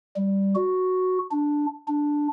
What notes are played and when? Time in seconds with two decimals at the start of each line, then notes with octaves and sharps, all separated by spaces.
0.16 G3
0.55 F#4
1.31 D4
1.88 D4